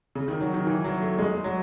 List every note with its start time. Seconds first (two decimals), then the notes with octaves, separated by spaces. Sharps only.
0.15 C#3
0.28 D#3
0.41 F#3
0.54 D#3
0.67 E3
0.84 F#3
1.01 A3
1.18 G#3
1.44 F#3